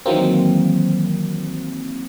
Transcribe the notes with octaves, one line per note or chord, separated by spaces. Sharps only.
D#3 E3 F#3 A#3 C4